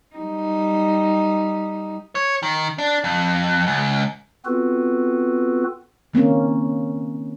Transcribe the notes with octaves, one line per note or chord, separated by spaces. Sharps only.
G3 D#4
C#5
D#3
D4
F2
C#2
B3 C4 F4 F#4 A4 B4
D#3 A#3 C4 C#4